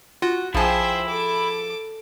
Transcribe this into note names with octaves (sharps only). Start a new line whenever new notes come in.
F4 F#4
A#1 F3 E4 G#4 C5 G5 A5
A4 D6